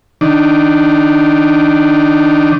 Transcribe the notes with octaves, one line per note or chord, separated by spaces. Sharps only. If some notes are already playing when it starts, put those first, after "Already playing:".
D#3 D4